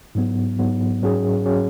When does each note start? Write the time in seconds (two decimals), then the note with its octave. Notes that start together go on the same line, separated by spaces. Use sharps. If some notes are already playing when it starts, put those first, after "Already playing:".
0.15 G#2 F#3 B3
0.59 G#2 F#3 B3
1.02 G#2 F#3 C#4 G#4
1.46 F#3 C#4 G#4